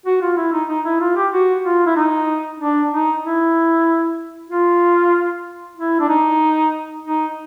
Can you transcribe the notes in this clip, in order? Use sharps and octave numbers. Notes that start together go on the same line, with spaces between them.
F#4
F4
E4
D#4
D#4
E4
F4
G4
F#4
F4
E4
D#4
D4
D#4
E4
F4
E4
D4
D#4
D#4